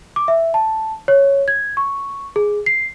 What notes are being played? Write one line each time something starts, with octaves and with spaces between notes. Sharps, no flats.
D6
E5
A5
C#5
G#6
C#6
G#4
C7